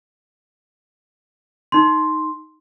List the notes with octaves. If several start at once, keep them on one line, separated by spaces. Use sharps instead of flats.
D#4 C6